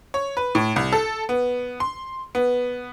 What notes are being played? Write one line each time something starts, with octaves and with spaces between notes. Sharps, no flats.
C#5
B4
A2
C2
A4
B3
C6
B3